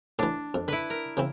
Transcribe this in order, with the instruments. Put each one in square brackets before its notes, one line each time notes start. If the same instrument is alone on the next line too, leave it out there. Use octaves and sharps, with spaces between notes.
[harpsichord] A2 E3 [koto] D4
[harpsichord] F2
[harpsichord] D3 [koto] E4 B4
[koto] A#4
[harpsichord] C#3 E3 C4